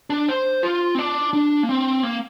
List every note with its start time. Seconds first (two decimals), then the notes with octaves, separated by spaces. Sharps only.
0.10 D4
0.29 C5
0.63 F4
0.95 C4
0.99 D4
1.33 D4
1.63 A#3
1.69 C4
2.03 A#3